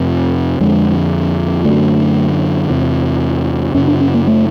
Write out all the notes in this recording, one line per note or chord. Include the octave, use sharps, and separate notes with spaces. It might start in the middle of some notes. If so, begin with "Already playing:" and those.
Already playing: F2 C3
F2 D3 G#3
F#2 D3 A3
E2 C3
F#2 C#3 C#4
D4
C#4
A#3
A3